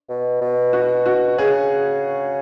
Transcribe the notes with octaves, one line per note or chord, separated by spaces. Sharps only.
B2
B2
F#4
F#4
C#3 G#4